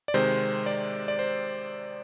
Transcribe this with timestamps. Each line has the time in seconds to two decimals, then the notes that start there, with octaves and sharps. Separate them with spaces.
0.08 D5
0.14 C3 D#3 G#3 C5
0.66 D5
1.08 D5
1.19 C5